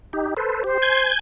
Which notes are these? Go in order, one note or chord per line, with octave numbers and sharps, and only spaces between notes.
D#4 G4
A4 B4 C5
G4 C5
G#5 G6 G#6